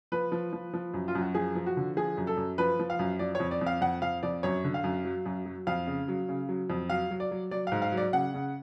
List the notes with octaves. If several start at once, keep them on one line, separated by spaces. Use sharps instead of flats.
F3 B4
F3
F3
F3
F#2
F4
F#2
F#4
F3 G#4
F3
F#4
D3
F3 G#4
F#2
A4
F#2
F3 B4
F3
F5
F#2
F3 D5
C#5
F2
D5
F2
F5
F2 F#5
F2 F5
F2 D5
F#2 C#5
D3
F5
F#2
F#3
F#2
F#3
F2 F5
C#3
F#3
C#3
F#3
F2
F#3 F5
F#3
D5
F#3
F#3 D5
G#2 F5
F5
F#3
D5
C#3 F#5
C#3